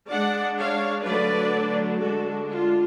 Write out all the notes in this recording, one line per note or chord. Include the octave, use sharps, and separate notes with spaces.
G#3 D4 D5 F#5
C#5 F5
D3 F#3 A3 D4 B4 D5
D3 G#3 D4 F#4 A4
F4